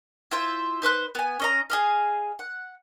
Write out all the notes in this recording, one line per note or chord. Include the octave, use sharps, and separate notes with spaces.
E4 F4 C5 E5
D#4 B4 C5 F#6
B3 G#5
C#4 D#5 A#5
G#4 D#5 F5
F#5